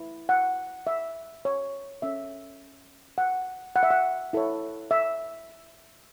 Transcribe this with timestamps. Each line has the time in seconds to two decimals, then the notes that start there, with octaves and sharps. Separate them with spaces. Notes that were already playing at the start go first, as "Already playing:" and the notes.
Already playing: E4 B4
0.29 F#5
0.87 E5
1.45 C#5
2.02 C#4 A4 C#5 E5
3.18 F#5
3.76 F#5
3.83 E5
3.90 F#5
4.33 E4 A4 C#5
4.91 E5